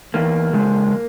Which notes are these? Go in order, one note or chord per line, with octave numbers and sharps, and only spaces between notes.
E2 A#3
C#3 F3 G#3